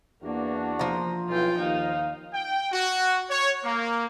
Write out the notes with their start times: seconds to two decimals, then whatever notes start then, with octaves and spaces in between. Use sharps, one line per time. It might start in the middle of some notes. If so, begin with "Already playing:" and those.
0.23 E2 A#3 D4 F#4
0.79 F3 A#5
1.29 B1 E3 F4 G5
1.58 D#2 D#4 F5
2.34 G5
2.72 F#4
3.29 C#5
3.64 A#3